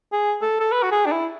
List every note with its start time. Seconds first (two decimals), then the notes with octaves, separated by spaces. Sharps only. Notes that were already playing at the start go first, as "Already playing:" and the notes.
0.13 G#4
0.42 A4
0.60 A4
0.72 B4
0.83 F#4
0.92 G#4
1.06 D4
1.12 E4